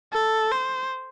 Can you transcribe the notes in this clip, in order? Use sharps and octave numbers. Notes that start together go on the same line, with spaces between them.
A4
C5